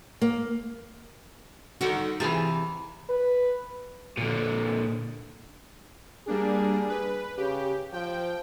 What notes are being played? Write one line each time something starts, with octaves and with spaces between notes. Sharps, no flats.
A#3
D3 D#3 F#4
C3 E3 F4 G#4
B4
A#2 D3
G3 A#3 D4 G#4
B4
C#3 G4
F3 G5